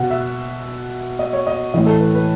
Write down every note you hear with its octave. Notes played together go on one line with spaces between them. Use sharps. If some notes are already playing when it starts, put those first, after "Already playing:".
Already playing: B2 F#5
E5
D#5
C#5
D#5
A2 E3 D#5
A4
B4
B4